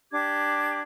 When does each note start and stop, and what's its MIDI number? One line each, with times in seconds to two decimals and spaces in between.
0.12 0.80 62
0.12 0.80 67
0.12 0.80 86
0.12 0.80 92